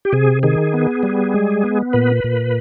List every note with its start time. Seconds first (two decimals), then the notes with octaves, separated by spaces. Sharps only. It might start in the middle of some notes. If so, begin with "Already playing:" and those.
0.05 G4
0.13 C3 G#4
0.43 D#3 G#4
0.74 B3
1.03 G3
1.34 G#3
1.63 B3
1.93 A#2 B4
2.24 A#2